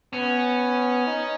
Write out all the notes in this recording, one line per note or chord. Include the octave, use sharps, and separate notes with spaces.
B3 C#4
D#4